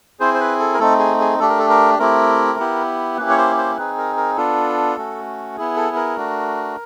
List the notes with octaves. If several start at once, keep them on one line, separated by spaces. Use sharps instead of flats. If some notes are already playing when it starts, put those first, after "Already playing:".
C4 E4 G#4 C5
C5
B4
A4
A#4
A3 C4 D#4 A4
G#4
G#4
A3 D4 G4 A4
A#4
A4
A#4
A3 C4 E4 G4 A#4
B3 E4 G4
A#3 C#4 E4 G4 B4
C#5
C5
C5
C4 D#4 G#4 B4
A#4
A#4
B3 D4 F4 A4
A3 C#4 F#4
B3 E4 G#4
A4
A#4
A3 D4 F#4